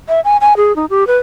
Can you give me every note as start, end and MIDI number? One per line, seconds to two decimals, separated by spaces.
0.09 0.20 76
0.25 0.37 80
0.41 0.53 80
0.57 0.75 68
0.76 0.86 63
0.90 1.07 67
1.07 1.18 71